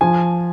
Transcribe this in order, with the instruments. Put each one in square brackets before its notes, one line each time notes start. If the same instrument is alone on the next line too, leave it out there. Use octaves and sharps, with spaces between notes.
[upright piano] F3 G#5